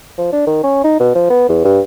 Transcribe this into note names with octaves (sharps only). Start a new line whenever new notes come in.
F3
D4
D#3
C#4
D#4
B2
F3
B3
E2
G2